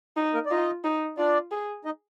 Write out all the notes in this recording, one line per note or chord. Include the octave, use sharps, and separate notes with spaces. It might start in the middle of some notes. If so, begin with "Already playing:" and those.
D#4
A#3 A#4
D5
D#4 F4 D#5
D#4
D4 F4 D5
G#4
D#4 D#5